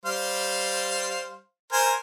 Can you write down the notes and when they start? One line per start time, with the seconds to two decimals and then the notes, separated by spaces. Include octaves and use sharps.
0.06 G3 C5 F5
1.73 A#4 C5 G#5